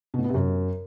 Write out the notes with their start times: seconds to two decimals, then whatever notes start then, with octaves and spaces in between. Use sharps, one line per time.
0.14 B2
0.19 A2
0.24 B3
0.29 C3
0.34 F#2